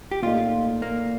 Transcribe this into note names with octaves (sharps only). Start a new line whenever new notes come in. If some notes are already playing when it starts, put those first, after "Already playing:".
G4
A#2 A3 D#4 F4
A#3